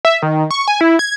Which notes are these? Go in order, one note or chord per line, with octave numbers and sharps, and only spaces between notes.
E5
D#3
C#6
G#5
E4
G#6